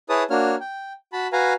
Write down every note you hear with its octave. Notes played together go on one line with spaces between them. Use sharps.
E4 G#4 B4 C#5 A5 D#6
A#3 D4 F#4 C#5 F6
G5
F#4 A5 B5
F#4 B4 F5 G#5 A#5